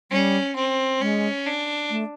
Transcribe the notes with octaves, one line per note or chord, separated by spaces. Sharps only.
G3 C#4
C4
G#3 C#4
D4
A3